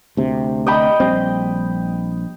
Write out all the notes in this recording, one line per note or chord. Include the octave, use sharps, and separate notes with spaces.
D2 C3
D#5 G5 B5
A#1 G3 C4